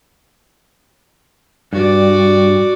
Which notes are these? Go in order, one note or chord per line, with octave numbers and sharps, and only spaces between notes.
G2 F#4 D5